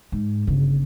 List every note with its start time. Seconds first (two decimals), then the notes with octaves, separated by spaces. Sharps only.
0.12 G#2
0.47 G1 C#3